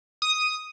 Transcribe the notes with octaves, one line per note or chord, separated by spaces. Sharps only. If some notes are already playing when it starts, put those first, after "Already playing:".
D#6